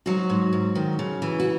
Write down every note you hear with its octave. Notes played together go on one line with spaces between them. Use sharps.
G#2 F#3 F#4
G#2
G#2
D#3
C#3
E3
F#4